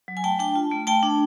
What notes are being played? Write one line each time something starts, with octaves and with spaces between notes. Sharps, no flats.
F#3
G#5
A3 G5 A5
D4 G5 A5
F4
A3
A3 G5 A5
D4